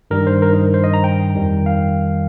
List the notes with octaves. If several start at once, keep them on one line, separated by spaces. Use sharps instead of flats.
G2 D#3 G3 A#4
C5
A#4
D#4
C5
D#5
A#5
G5
F2 D#3 G3
F5